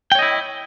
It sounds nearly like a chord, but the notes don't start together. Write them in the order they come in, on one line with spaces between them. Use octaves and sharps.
G5 C#5 D#5 E4